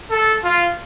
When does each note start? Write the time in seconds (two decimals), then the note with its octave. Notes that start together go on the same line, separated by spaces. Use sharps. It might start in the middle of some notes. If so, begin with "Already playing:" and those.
0.11 A4
0.44 F4